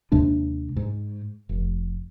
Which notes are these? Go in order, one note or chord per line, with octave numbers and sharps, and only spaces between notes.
D#2 C3 G#3 D4
G#2
F1